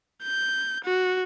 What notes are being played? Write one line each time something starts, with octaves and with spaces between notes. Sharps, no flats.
G6
F#4